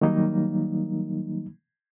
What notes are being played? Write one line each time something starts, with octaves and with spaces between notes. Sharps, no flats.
D#3 F#3 G3 A#3 D#4